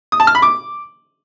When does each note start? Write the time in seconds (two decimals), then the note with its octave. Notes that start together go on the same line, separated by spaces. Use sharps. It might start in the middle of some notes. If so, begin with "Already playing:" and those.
0.12 D#6
0.20 A5
0.27 F6
0.35 B5
0.42 D6